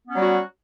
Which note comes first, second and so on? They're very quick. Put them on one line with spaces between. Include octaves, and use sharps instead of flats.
B3 C#4 F#3 G3 F#4